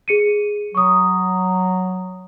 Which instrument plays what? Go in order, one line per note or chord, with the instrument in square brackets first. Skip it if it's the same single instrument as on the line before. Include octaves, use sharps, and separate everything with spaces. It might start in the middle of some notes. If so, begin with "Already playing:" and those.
[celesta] G#4 C#7 D#7
[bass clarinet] F#3 [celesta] C#6 D#6